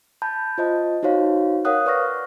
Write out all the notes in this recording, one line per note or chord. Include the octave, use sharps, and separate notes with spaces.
A5 B5 G6
F4 C5 D#5 A5
D#4 F#4 C5 C#5 F5
A#4 C#5 F5 F#5 D#6 F#6
B4 D5 F#5 C#6 F6 A#6